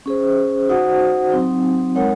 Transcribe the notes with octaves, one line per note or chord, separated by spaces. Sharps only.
C#4 G#4 C5
D#4 F#4 C5 F#5
F#3 C4 D#4
G#3 D#4 A#4 C#5 F#5